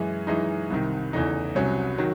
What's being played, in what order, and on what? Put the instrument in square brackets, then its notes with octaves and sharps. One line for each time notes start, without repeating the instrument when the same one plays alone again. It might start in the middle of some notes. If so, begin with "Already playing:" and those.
Already playing: [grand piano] F#2 E3 G#3
F#2 E3 G#3 D#4
C2 C3 D#3
E2 C#3 E3 A3 D#4
C2 C3 F#3 C#4
D#3 F#3